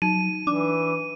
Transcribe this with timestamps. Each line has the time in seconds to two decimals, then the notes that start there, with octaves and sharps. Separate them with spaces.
0.02 F#3 D#4 D#7
0.47 E3 D4 D6